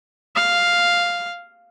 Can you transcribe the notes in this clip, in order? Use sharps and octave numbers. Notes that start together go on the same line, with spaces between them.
F5